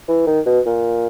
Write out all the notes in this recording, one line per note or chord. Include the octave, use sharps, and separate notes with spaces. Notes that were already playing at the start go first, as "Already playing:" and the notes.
E3
D#3
B2
A#2